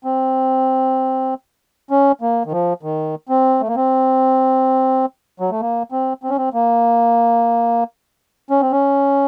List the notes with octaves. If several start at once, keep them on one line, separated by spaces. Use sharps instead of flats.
C4
C#4
A#3
D#3
F3
D#3
C4
A3
A#3
C4
F#3
A3
A#3
C4
C4
C#4
C4
A#3
C#4
C4
C#4